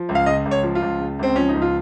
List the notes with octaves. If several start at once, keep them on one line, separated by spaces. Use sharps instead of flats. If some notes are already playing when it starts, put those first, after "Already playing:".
Already playing: F3
C#2
F5
C#3 D#5
C#2
C#5
F3
F4
C#2
C#3
C#2 C4
F3 C#4
D#4
C#2
F4